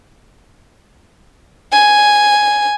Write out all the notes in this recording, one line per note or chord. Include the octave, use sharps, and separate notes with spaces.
G#5